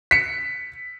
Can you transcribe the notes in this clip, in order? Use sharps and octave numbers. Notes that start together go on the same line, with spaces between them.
B6 C#7